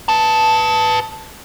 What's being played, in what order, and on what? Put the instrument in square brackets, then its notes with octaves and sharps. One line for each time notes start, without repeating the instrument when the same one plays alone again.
[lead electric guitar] B4 A5